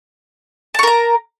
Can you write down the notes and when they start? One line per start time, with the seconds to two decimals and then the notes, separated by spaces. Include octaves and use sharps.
0.74 A5
0.79 C#6
0.83 A#4
0.87 A#5